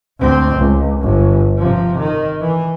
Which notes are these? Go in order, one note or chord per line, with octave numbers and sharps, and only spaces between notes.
D2 C4
C#2
G1
C3 F3
D#3
E3